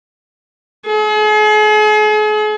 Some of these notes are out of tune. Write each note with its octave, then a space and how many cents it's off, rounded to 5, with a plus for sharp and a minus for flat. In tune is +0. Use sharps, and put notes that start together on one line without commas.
G#4 +40